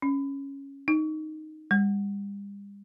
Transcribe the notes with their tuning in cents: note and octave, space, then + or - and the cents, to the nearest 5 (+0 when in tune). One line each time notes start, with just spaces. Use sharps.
C#4 -5
D#4 -5
G3 +40